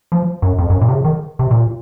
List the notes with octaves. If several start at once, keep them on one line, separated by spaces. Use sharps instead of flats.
F3
F#2
F2
F#2
A#2
C3
C#3
D#3
C3
A#2